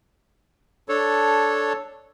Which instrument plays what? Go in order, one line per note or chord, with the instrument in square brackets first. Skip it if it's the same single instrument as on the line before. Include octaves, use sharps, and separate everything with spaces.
[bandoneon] D4 A4 C#5